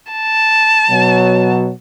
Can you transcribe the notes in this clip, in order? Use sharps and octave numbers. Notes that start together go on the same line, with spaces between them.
A5
B2 F#3